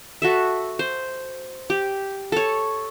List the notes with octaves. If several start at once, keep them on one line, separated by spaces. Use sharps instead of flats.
F#4 A4 E5
C5
G4
A4 C#5